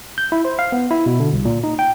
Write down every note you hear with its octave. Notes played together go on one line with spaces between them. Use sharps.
G6
E4
C5
F5
B3
E4
B2
D3
C2
A#2
D#4
G5